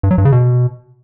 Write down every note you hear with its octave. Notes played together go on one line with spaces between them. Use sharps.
G2
F#3
G2
C#3
B2